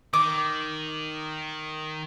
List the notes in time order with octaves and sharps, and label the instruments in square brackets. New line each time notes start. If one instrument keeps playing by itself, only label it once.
[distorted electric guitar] D#3 [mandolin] D6